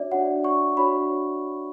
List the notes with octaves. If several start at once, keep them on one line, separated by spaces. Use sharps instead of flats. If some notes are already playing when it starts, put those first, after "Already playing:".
Already playing: D4 F#4 C#5 D5 E5
D4 F#4 C#5 F#5
C#6
D4 F#4 C#5 B5